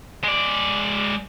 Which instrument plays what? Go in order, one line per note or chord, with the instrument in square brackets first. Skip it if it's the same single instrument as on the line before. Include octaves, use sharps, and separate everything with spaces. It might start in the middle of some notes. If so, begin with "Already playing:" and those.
[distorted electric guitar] G#3 D5